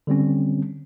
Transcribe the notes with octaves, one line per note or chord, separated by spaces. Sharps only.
D3 G3 C4 C#4